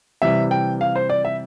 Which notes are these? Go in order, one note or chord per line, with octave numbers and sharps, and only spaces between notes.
C3 E3 G3 E5
G5
F5
C5
D5
E5